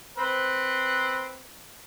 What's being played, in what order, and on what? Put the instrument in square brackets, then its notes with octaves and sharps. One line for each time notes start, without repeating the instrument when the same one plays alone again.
[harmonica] C4 B4 C5